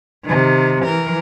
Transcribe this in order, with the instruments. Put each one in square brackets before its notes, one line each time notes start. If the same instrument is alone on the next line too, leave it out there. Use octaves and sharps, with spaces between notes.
[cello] C3 D#3
E3 A#4